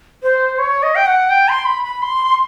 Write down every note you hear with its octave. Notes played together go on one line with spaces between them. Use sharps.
C5
C#5
D#5
G5
F#5
G5
C6
B5
B5
C6